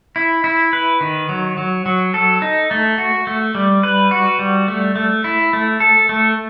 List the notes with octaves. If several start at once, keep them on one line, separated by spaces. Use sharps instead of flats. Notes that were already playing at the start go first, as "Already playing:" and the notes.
E4
E4
B4
D#3
F#3
F#3
F#3
A4
D#4
A3
F#4
A3
G3
B4
F#4
G3
A3
A3
E4
A3
A4
A3